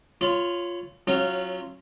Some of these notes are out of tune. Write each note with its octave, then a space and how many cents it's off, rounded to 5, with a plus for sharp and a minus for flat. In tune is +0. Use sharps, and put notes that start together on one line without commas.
F4 +0 C#5 +0 B5 +45
F#3 +0 C#4 -20 F4 -15